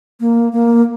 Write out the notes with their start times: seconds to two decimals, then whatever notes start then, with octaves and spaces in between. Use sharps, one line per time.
0.20 A#3
0.53 A#3